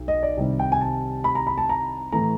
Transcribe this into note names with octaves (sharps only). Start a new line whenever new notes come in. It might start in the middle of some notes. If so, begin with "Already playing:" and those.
Already playing: B1
D#5
D5
C2 C3 D#3 G3
G5
G#5
A5
B5
A#5
B5
A5
A#5
A2 E3 A3 A#5